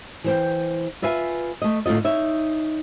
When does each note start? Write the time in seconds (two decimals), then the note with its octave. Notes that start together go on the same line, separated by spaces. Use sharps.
0.24 E3 C5 G5
1.02 F4 B4 E5 F5 G#5
1.62 A3 D#5
1.86 A2 D3 F4 D#5
2.04 D#4 C#5 E5